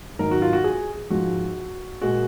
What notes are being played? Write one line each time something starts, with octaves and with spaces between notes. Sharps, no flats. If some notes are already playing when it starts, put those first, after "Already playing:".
G#2 D#3 F#3 A#4
F#4
F4
F#4
G#4
G#2 F3 G#3 F#4
A#2 G#3 F#4